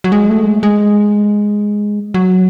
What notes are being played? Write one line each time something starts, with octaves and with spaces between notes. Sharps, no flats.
F#3
G#3
A3
G#3
G#3
F#3